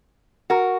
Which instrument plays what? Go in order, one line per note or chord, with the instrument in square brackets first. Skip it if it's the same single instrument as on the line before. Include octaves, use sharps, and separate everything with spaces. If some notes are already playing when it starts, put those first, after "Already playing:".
[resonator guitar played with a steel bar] F#4 A#4